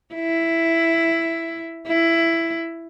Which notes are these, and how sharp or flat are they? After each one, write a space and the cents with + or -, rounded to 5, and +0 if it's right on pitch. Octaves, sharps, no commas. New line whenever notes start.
E4 +5
E4 +10